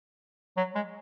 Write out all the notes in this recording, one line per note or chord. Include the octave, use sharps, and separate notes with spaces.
F#3
G#3